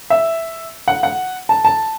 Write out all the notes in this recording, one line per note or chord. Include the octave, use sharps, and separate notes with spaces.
E5
F#5
F#5
A5
A5